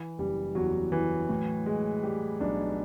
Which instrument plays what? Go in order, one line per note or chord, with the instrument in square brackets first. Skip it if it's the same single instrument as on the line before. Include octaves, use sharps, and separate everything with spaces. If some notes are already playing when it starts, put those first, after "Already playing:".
Already playing: [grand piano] E3
F#1 G3 G4
E2 F#3 F#4
E3
A2
G#3
G3 G#3 G4
B1 D4